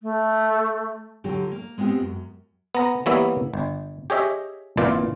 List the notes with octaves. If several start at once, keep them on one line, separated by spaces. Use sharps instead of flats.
A3
D#2 D3 F#3 F4 G4
A#3
G#3 B3 C4 F4 G4
F#2
B3 A#5
E3 G3 A#3 B3 C#5 E5
G1
G4 G#4 C#5 D#5 E5
G#1 A#2 E3 F4 D5